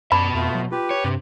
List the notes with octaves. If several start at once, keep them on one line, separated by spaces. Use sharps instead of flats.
F#2 B2 D5 A5 B5
F2 A3 F4
F#3
F4 G4 B4
C#5
G2 C3